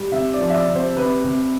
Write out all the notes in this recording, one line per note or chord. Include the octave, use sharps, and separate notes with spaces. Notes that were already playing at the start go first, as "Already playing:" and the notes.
Already playing: G3
C3 E5
D5
F3
E5
D5
C3
C5
C3 B4
C3